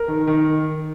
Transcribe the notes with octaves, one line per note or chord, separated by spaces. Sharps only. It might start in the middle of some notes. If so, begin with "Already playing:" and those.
Already playing: A#4
D#3
D#3